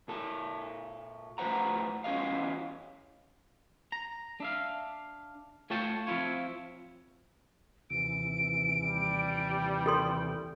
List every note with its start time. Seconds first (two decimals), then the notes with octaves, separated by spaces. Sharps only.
0.08 A#2 A4
1.38 A2 F3 B4 C5 F#5 A#5
2.04 E2 E3 C#4 G#4 D#5 F5
3.92 A#5
4.40 D4 E5 F5
5.70 A3 F4 C#5 G5 A5
6.07 F3 C4 E4 F4 C#5
7.90 D#2 C3 E3 D7
8.82 G3
9.86 G4 A4 G5 C6